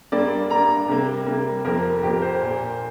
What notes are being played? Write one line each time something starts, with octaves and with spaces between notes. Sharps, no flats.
G2 G3 A#3 D5
G2 G3 A#3 A#5
C3 G3 A#3
C3 G3 A#3
F2 F3 A#3 A#4
F2 F3 A#3 G4
C5
A#2 A#3